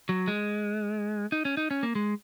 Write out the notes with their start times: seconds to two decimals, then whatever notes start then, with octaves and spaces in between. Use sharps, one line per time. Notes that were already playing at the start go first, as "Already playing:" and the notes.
0.09 F#3
0.28 G#3
1.32 D#4
1.45 C#4
1.57 D#4
1.71 C#4
1.83 A#3
1.95 G#3